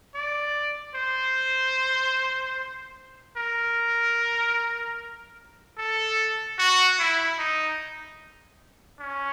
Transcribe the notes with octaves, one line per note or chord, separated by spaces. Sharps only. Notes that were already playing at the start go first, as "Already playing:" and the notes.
D5
C5
A#4
A4
F#4
E4
D#4
C#4